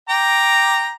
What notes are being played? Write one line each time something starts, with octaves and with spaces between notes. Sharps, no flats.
G5 A#5 D6